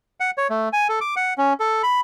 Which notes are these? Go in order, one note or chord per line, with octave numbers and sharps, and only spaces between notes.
F#5
C#5
A3
G#5
A4
D6
F#5
C#4
A4
B5